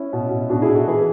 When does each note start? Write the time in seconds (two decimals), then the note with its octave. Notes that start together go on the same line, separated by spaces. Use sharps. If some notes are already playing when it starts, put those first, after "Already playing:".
Already playing: C#4 E4
0.13 B2
0.31 B2
0.50 B2 D4 F#4
0.62 E4 G#4
0.69 B2
0.75 F#4 A4
0.87 E3 G#4 B4